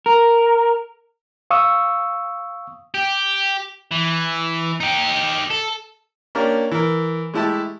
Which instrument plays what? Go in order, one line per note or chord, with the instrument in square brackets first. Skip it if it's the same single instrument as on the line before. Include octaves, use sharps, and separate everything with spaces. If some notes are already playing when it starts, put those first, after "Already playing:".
[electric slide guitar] A#4
[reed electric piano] F5 C#6 D#6 E6
[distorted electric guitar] G4
E3
D#4 G4
A4
[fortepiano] A#3 C#4 D4 G4 A#4
E3 A#4
G#3 A3 E4 G4 A5